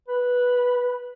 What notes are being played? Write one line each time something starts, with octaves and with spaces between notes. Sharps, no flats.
B4